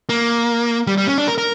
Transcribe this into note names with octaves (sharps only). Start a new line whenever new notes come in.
A#3
G3
G3
C#4
D4
A#4
A#4